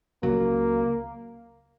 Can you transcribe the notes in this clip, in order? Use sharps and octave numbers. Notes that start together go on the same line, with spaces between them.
C#2 C#3 F#3 A#3